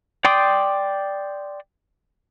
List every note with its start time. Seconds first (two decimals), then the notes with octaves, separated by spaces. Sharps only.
0.25 D5 G5 C6 D6 D#6